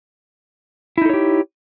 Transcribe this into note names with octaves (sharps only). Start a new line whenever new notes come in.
D#4 E4 G4 A4 C#5